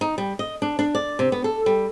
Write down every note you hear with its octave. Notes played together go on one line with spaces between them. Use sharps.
D#4
G3
D#5
D4
D4
D5
C3
B3
A4
G3